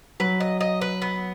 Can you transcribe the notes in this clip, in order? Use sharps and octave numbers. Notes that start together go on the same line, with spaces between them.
F#3 B4
D#5
D#5
B4
B3